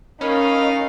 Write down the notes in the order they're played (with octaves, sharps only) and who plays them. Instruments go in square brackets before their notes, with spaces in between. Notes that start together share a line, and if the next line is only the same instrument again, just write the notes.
[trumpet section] A3 F5 [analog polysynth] C#4 [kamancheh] D#4 [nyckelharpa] A#4 B5